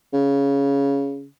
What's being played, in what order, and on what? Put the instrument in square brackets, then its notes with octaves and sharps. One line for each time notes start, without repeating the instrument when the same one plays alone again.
[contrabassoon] C#3